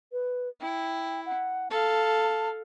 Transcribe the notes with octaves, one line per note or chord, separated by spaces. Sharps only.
B4
E4 G5
F#5
A4 F5 A5